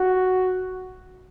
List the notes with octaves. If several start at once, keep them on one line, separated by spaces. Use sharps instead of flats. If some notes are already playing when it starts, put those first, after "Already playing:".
Already playing: F#4